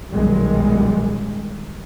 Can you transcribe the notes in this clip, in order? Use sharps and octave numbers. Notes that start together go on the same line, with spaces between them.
B1 F#2 A#2 D#3 G3 G#3